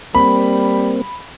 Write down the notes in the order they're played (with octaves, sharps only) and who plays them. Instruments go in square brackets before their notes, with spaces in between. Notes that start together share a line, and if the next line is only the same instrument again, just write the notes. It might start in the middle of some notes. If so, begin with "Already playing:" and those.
[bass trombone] G3 [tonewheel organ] A#3 C4 [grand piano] B5